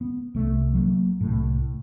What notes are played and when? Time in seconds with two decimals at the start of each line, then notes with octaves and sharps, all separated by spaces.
0.01 B3
0.35 C2 A3
0.74 F#3 G#3 A#3
1.21 C2 A2